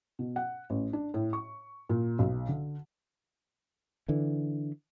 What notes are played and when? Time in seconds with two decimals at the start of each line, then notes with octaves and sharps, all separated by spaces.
0.19 B2
0.36 F#5
0.70 A1
0.93 D4
1.14 A2
1.33 C#6
1.89 A#2
2.19 B1
2.49 D3
4.08 D3 E3